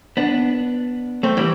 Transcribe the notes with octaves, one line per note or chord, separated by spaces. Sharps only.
B3 D4
A3 C4
E3 G3